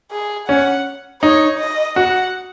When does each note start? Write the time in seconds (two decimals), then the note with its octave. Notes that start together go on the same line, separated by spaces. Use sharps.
0.11 G#4
0.48 C#4 F#5
1.22 D#4 C#5
1.58 D#5
1.96 F#4 F#5